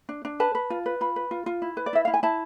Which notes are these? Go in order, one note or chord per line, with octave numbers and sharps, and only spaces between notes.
D4
D4
B4 A5
B4
F4
B4
F4 B5
B4
F4
F4
E4
B4
D5
E4 E5
E4 F5
G#5
E4 A5